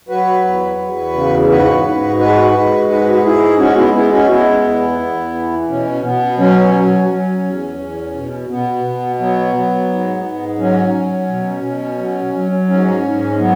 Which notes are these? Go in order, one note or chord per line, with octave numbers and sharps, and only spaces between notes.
F#3 F#4 B4
E2
E2
C#3
G#2 F#4 B4
G#2
G#3 F#4 B4
G#3
G#2 F#4 B4
F#4
G#2 E4 G#4
G#3 C#4 F#4
B3 E4
G#3 B3 E4
C#4 F#4
G#3 B3 E4
E2
E2
E3
B2 C#4
B2 B3
F#3 C#4
F#3
F#3
E2
E2
B2
B2 B3
B2
F#3 B3
F#3
G#2
G#2
F#3 C#4
F#3
B2
B2
F#3
F#3
G#2 C#4
G#2
F#3 B3